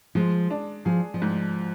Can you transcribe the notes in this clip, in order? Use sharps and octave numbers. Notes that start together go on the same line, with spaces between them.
F3 G#3
D4
F3 G#4
F3
G#2